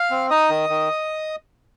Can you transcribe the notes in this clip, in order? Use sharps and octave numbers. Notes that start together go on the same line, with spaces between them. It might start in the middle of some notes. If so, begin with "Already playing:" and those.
Already playing: F5 F6
C4
D#4 D#5 D#6
D#3
D#3